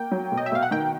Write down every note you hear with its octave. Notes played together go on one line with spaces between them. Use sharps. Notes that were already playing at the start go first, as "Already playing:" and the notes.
Already playing: A#3 G5
F#3
B2
D#5
E5
B2 F5
F#5
D#3 G5